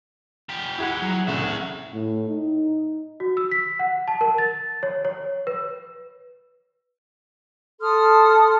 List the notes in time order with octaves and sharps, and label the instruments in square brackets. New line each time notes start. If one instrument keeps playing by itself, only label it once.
[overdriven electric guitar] F4 G4
[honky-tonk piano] E4 G#4 F#5
[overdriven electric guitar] F#3
[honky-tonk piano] C2 A2 C#3 [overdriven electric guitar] E5 F#5
[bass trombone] A2
D#4
[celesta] F#4
E6
B6
F#5
A5
A#4
A6
C#5
C#5
B4
[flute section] A4 C6 D#6 F6